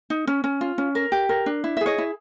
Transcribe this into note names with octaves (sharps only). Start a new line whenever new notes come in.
D#4
C#4
C#4
F4
C#4
A#4
G4
A#4
D4
E4
G#4 E5
C#5 D#5
E4